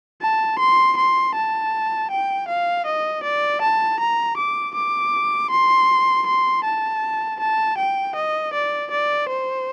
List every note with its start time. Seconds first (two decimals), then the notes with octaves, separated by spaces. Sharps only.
0.22 A5
0.59 C6
0.97 C6
1.35 A5
2.11 G5
2.48 F5
2.86 D#5
3.24 D5
3.62 A5
4.00 A#5
4.37 D6
4.75 D6
5.51 C6
6.27 C6
6.65 A5
7.40 A5
7.78 G5
8.16 D#5
8.53 D5
8.91 D5
9.29 C5